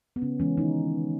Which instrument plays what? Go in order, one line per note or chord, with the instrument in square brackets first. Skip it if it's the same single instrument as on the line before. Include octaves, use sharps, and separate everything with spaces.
[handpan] B3
C#3 C#4
E3 G#3 C#4
D#3 D#4